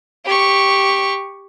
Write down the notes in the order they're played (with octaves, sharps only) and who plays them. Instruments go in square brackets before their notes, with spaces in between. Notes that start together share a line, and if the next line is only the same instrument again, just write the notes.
[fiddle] G4 C#6